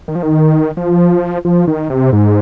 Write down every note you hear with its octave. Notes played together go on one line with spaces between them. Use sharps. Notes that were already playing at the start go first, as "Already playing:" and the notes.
D#3
F3
D#3
F3
F3
D#3
C3
G#2